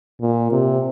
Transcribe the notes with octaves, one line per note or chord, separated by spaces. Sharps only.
A#2
C3